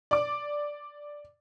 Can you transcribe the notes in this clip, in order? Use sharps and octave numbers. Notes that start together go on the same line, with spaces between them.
D5 D6